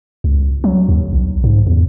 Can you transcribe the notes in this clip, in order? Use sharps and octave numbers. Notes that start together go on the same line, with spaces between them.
C#2
F#3
D#2
B1
G#2
E2